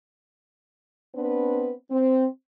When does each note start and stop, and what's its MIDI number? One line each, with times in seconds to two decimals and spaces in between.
1.15 1.73 59
1.15 1.73 60
1.15 1.73 62
1.15 1.73 71
1.91 2.27 60